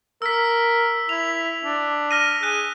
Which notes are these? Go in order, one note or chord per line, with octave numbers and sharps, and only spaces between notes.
A#4 E6 B6
E4 F7
D4
F6 A#6 D#7
G#4 F#6 D#7